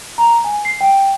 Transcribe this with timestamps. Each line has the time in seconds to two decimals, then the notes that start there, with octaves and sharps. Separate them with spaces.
0.18 A#5
0.44 G#5
0.65 C7
0.81 G5